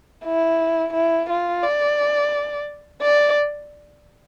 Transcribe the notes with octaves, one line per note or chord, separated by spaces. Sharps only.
E4
E4
F4
D5
D5